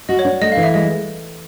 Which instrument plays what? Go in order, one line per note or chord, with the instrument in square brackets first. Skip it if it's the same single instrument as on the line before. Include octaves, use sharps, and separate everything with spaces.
[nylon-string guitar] F#4 [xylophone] D#5
[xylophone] C#5
[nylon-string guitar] D4
[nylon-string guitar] A3 [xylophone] D#5
[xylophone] F5
[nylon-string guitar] E3
[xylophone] E5
[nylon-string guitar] G#3 [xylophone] D#5